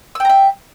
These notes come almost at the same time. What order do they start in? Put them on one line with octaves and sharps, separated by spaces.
E6 G5 A#5 E5